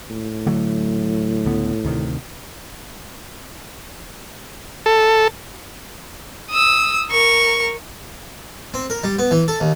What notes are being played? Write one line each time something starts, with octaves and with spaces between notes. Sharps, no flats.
A2
D3 F#3 A3
C#2 D3 B3
D2 C3 D#3
A4
D#6 E6
A#4 C#6
C4
A#4
G3
B3
E3
A4
D#2